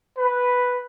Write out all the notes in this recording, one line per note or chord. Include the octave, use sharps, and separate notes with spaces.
B4